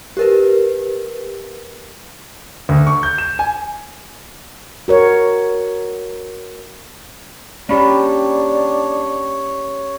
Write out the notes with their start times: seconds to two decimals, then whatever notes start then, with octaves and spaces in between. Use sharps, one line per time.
0.17 G4 A#4 B4
2.69 D2
2.87 C#6
3.03 G6
3.18 E7
3.39 G#5
4.88 F#4 A#4 C#5
7.69 A#3 C#4 D4 G4 C#5 B5